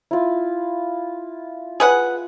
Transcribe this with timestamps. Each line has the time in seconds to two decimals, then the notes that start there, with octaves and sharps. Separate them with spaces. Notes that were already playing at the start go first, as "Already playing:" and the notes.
0.11 E4 F4
1.80 G#4 B4 F#5